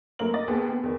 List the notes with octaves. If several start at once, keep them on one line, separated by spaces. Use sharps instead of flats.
F#2 A3 A#3 A#4 F#7
D#5 D6 A6
D#2 B3 G#4 A4
B3
E2 D#3